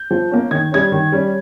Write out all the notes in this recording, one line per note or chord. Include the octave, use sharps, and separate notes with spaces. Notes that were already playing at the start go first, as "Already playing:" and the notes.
Already playing: G6
F3
A#3 C#4
D#3 G#6
G3 C#4 G#6
D#3
G3 C#4